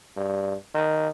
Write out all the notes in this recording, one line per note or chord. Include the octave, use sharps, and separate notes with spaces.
G2
D#3